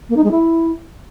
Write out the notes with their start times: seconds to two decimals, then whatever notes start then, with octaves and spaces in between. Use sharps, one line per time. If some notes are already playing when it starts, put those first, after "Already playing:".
0.09 A#3
0.17 D#4
0.24 G#3
0.31 E4